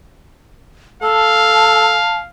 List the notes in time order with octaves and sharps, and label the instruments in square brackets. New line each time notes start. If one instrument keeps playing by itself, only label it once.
[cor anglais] A4 [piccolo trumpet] F5 [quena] A5